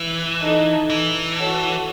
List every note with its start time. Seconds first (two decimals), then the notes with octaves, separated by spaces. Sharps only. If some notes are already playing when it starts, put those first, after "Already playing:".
Already playing: E3
0.42 D#4 A4 D#5
0.90 E3
1.38 F#4 A4 C#5